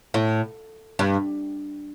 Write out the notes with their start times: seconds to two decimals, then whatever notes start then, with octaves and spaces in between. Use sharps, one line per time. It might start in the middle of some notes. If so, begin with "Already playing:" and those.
0.14 A2
0.99 G2